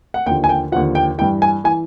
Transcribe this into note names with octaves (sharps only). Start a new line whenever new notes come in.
F#5
D#2 D3 F3 G5
G#5
G5
D#2 D3 F3 F#5
G5
G2 E3 G5
G#5
E3 G#5